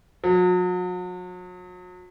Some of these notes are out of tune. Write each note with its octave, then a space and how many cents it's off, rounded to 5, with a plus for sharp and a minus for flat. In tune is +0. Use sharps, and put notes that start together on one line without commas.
F#3 -40